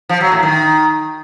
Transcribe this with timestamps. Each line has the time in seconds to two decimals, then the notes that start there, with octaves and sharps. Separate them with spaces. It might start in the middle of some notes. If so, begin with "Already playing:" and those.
0.09 F3
0.21 F#3
0.32 A2
0.43 D#3